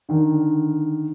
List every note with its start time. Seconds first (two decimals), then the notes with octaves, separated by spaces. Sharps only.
0.09 D3 D#3